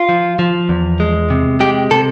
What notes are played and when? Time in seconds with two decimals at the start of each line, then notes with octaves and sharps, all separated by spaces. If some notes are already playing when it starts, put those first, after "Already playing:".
Already playing: F4
0.09 F3
0.39 F3
0.69 E2
1.00 G#3
1.30 C3
1.60 G#3 G4
1.91 C3 A4